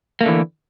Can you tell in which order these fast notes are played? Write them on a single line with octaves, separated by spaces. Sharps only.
A#3 A3 D3 E3